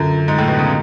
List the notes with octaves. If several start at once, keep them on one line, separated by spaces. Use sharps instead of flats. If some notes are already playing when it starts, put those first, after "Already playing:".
Already playing: F#2 D3 F#3 C#4 F4 A4
G#2
A2
B2
C#3